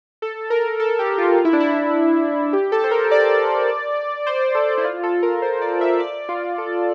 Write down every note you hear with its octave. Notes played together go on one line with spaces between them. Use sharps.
A4
A#4
A4
G4
F4
F4
E4
D4
E4
G4
A4
C5
A#4
D5
C5
A4
E4
F4
A4
A#4
C5
D5
E5
D5
F4
A4